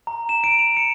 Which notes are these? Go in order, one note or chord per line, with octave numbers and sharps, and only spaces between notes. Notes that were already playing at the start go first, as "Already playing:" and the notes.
A#5
E7
D7
F7
C#7